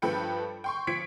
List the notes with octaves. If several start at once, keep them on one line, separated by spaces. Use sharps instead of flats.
G2 F3 A4 B4 G5 C#7
G5 C6 C#6
F3 G#6 B6 C#7 D7